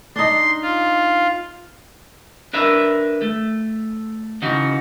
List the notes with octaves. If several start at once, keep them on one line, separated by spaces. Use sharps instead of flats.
D4 D#4 C6
F4
D4 A#4 B4 E5
A3
C#3 E3 D#4 F#4